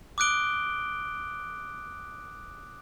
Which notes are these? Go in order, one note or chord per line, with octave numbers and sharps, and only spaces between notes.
D6 D#6 F#6 D7 G7